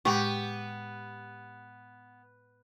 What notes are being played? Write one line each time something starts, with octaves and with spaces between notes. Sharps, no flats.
A2 G#3 B3 G4 G5 C#6